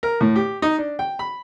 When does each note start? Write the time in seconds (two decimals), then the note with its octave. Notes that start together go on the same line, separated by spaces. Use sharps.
0.03 A#4
0.21 A2
0.36 G4
0.62 D#4
0.78 D4
0.99 G5
1.19 B5